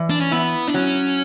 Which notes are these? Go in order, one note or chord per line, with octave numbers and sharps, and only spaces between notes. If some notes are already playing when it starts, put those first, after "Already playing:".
Already playing: E3 D5
D4
C#4
B3 E4
D4
F#3 C#4